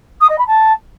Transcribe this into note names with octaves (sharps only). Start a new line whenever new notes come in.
D#6
D#5
B5
A5